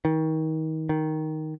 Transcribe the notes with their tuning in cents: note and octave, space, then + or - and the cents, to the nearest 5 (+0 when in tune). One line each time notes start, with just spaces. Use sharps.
D#3 +30
D#3 +5